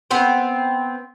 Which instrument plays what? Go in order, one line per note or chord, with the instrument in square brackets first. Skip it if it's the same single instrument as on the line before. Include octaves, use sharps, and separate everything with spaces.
[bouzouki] B3 C4 C5